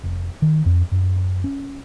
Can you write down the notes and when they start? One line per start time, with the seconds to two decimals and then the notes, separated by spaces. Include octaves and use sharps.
0.04 F1
0.42 D#3
0.66 F2
0.92 F#2
1.44 C#4